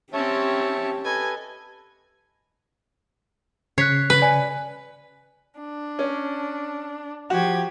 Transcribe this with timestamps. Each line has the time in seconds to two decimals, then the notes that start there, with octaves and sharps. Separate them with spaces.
0.13 C4 C#4 G4 C#5 E5 A5
1.05 A4 B4 D#5 G#5
3.78 C#3 C#5 F#6 B6 C7
4.10 B4
4.22 D5 G#5
5.59 D4
5.99 C#4
7.30 F3 F#4 G4 G#6